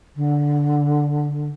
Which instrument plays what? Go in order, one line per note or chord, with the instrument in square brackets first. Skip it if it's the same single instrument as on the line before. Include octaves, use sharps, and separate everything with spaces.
[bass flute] D3